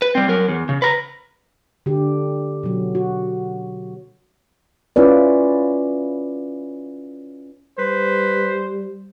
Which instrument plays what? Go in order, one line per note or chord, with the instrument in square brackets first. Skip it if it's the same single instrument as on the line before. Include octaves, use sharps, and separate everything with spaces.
[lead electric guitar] B4
G3 C4
F#3 A#4
E2
C#3
B4 A#5
[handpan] D3 G4
B2 F#3
F#4
C#4 E4 F4 B4 D5
[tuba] G3 [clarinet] B4 [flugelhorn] C5